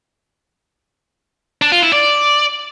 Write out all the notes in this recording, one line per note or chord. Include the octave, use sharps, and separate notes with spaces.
D4
F4
E4
D5